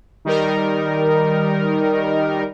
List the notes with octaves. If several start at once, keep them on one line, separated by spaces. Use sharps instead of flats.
D#3 G3 D#4 A#4